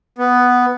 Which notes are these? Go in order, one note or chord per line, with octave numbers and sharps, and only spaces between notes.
B3